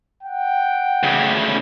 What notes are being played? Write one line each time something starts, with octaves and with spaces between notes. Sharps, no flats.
F#5 G5
D2 C#3